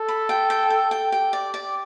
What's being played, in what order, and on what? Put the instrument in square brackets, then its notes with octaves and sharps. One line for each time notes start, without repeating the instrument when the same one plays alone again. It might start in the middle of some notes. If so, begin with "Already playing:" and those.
Already playing: [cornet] A4
[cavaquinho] B5
G5
G5
G5
G5
[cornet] G4 [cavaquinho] G5
[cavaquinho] D5
D5